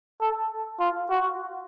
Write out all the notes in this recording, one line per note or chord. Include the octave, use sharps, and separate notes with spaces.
A4
F4
F#4